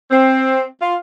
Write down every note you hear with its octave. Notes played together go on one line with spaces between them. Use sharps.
C4
F4